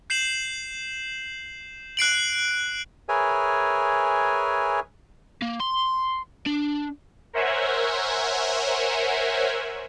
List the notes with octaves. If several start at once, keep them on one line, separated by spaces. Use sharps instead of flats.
G6 C7 E7 F#7
F#6 C7 D7 F#7
G#4 A#4 B4 C#5 E5 G#5
A#3
C6
D4
A#4 C5 C#5 E5 F#5 G#5